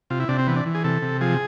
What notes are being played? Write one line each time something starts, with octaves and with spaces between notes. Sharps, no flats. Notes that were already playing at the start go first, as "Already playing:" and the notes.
C3 F4
E4
C3 D4
C4
E3 B3
D4
E3
G#4
C3 A4
C3
F3 G#4